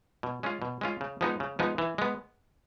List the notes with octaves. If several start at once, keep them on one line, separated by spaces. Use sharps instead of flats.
B2
G#3 C#4 F4
B2
G#3 C#4 F4
C#3
F3 G#3 B3 D#4
C#3
F3 G#3 B3 D#4
E3
G#3 B3